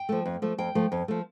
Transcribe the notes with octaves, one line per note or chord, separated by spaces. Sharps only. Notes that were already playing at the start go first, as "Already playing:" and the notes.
Already playing: G5
F3 A3
F2
F3 A3
F2 G5
F3 A3
F2
F3 A3